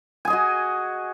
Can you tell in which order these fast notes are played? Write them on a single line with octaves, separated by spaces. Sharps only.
G#5 G#4 D#5 F#4